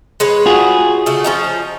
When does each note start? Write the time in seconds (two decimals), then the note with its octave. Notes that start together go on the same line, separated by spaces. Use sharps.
0.20 G#3 B4 C#5
0.46 F4 F#4 G#4
1.06 C#3 A3
1.24 F3 C#4 D#4